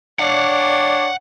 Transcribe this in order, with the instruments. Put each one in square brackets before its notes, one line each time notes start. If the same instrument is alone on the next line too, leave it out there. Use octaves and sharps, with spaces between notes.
[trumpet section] D4 C#5 D5 [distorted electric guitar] F5 F#5